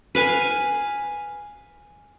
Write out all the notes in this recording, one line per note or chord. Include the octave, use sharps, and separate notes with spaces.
B4 F5 G#5